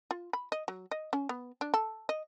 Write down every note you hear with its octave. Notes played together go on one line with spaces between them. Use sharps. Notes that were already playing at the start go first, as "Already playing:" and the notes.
F4
B5
D#5
F#3
D#5
C#4
B3
D4
A4
D#5